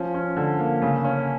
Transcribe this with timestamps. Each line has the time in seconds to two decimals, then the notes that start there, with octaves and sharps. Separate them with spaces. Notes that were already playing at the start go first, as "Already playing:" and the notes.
Already playing: F3 C#4
0.14 C#4
0.37 D3
0.59 A#3
0.82 C#3
1.04 C#4